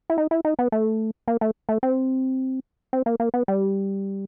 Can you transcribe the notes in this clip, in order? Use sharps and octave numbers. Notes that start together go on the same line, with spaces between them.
E4
D#4
E4
D#4
B3
A3
A#3
A3
A3
C4
C4
A#3
A#3
B3
G3